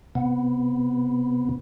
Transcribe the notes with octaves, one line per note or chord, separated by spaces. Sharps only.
C3 B3